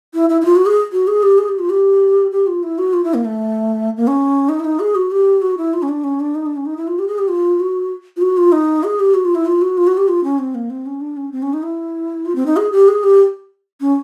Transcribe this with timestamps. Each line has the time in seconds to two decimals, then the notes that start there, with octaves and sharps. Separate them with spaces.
0.14 E4
0.30 E4
0.41 E4
0.45 F4
0.56 F#4
0.66 G#4
0.92 F#4
1.07 G#4
1.23 G4
1.38 G#4
1.48 G4
1.59 F4
1.70 G4
2.32 G4
2.47 F4
2.63 E4
2.78 F#4
2.93 F4
3.04 E4
3.14 A#3
3.25 A3
3.97 A#3
4.07 C#4
4.49 D#4
4.60 E4
4.64 D#4
4.80 G#4
4.95 F#4
5.11 G4
5.42 F#4
5.58 E4
5.74 F4
5.82 C#4
5.89 D4
6.04 C#4
6.20 D4
6.35 D#4
6.46 D4
6.56 C#4
6.66 D#4
6.77 E4
6.88 F4
6.99 G4
7.08 G#4
7.18 G4
7.28 F4
7.60 F#4
8.17 F4
8.22 F#4
8.37 F4
8.52 D#4
8.84 G#4
9.00 G4
9.14 F#4
9.25 F4
9.35 E4
9.46 F4
9.62 F#4
9.78 F4
9.87 F#4
9.97 G4
10.08 F4
10.24 C#4
10.39 C4
10.55 A#3
10.70 C4
10.86 C#4
11.01 D4
11.17 C#4
11.32 C4
11.42 C#4
11.53 D#4
11.63 E4
12.26 F4
12.35 C4
12.46 D#4
12.57 G#4
12.72 G4
12.88 G#4
13.03 G4
13.81 C#4